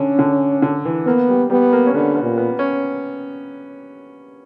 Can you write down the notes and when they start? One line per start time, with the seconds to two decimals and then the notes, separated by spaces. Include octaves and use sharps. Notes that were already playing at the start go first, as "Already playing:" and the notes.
Already playing: D3 C#4
0.19 D3
0.62 D3
0.85 E3
1.06 A#3 B3
1.29 G3
1.50 G3 B3
1.73 A#3
1.86 C#4
1.94 D3 B3
2.16 B3
2.23 A#2
2.38 B3
2.59 C#4